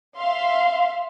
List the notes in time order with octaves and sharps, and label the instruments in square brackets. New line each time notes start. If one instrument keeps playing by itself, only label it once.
[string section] E5 F5 C6